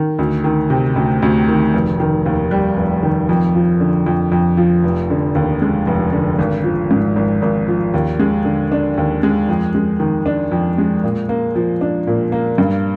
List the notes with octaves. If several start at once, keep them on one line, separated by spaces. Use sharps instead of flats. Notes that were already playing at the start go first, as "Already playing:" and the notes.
Already playing: D#3
D2
D#3
C3
D2
D2
D#3
F1
D#3
D#2
G3
F1
D#3
F2
F3
D3
F2
F2
F3
F1
D3
D#2
G#3
F1
D3
G#1
F3
G#2
G#1
G#1
F3
D#2
G#3
D3
D4
D#2
G#3
F2
G#3
D#3
D4
F2
G#3
A#2
A#3
F3
D4
A#2
A#3
G2